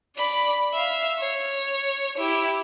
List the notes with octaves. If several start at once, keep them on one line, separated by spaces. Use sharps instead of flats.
D5 B5
E5 F5
C#5
E4 G4